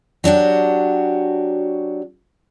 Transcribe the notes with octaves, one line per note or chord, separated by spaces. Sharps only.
F#3 D4 F#4 G4